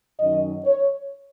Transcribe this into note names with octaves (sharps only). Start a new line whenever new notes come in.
F#2 D#3 F#3 C#4 D#5
C#5